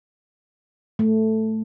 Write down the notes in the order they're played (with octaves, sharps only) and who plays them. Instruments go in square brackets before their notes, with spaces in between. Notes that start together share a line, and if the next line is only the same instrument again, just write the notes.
[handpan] A3